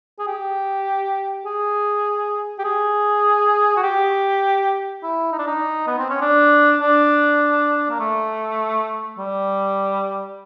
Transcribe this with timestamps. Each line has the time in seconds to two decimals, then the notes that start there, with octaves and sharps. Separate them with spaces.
0.19 G#4
0.27 G4
1.45 G#4
2.58 G4
2.64 G#4
3.76 F#4
3.83 G4
5.03 E4
5.32 D#4
5.39 D4
5.47 D#4
5.87 B3
5.98 C4
6.10 C#4
6.21 D4
6.81 D4
7.90 A#3
8.00 A3
9.18 G3